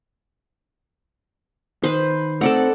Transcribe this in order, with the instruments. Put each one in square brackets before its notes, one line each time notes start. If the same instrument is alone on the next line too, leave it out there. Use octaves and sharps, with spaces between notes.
[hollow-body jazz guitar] D#3 [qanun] B4 C5
[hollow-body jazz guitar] A3 C4 D#4 [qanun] A4 D5 F#5